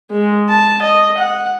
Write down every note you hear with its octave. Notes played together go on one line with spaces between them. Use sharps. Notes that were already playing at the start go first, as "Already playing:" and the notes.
G#3
A5
D#5
F#5